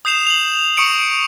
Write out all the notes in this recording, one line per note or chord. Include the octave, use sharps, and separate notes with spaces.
D#6 G6 C7 E7 F7
F7 F#7
C#6 D#6 C#7 D7 F7